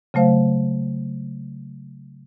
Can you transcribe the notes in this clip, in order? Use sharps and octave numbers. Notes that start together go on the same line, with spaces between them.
C#3 F#3 A3 C5 F5